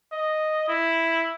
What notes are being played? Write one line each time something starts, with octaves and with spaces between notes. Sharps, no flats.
D#5
E4